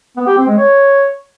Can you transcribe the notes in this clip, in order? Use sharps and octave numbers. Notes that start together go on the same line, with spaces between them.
B3
G4
C4
G#3
C#5